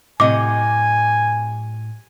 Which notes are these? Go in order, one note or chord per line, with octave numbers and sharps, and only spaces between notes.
A2 C3 F#3 D#5 G#5 D6